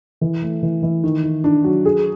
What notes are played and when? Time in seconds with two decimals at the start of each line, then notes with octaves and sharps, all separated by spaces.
0.21 E3
0.42 A3
0.63 E3
0.83 E3
1.04 D#3
1.24 D#3
1.44 D4
1.64 F#3
1.85 G#4